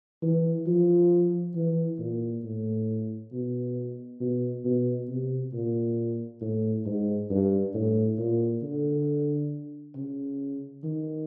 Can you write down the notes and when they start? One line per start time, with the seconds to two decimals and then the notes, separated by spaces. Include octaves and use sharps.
0.23 E3
0.67 F3
1.55 E3
1.99 A#2
2.44 A2
3.32 B2
4.20 B2
4.64 B2
5.09 C3
5.53 A#2
6.41 A2
6.86 G#2
7.30 G2
7.74 A2
8.19 A#2
8.63 D3
9.95 C#3
10.83 D#3